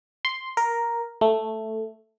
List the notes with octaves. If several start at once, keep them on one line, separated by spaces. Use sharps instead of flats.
C6
A#4
A3